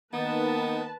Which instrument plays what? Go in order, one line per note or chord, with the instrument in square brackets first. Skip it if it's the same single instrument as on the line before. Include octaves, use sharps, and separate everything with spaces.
[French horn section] D#3 A#3 [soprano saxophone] B3 [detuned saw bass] D#4 [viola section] B4 A5